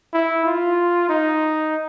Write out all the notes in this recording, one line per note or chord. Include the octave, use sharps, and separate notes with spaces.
E4
F4
D#4